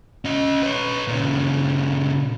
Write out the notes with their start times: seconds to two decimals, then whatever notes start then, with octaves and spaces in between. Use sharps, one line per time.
0.25 C#4 D#5
0.63 B4 C#5
1.08 A#2 C#3